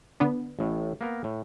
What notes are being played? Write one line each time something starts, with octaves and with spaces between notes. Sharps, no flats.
D3 B3 D4
A1 A2
A#3 B3 A#4
A2